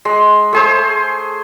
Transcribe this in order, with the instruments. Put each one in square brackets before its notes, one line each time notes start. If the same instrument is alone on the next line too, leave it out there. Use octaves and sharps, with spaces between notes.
[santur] G#3
A3 G#4 C5